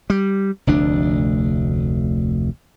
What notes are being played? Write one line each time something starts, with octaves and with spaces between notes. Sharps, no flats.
G3
F1 D2 D4